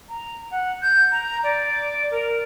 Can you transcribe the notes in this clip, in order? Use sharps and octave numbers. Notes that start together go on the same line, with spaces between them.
A#5
F#5
G6
A#5
D5
A#4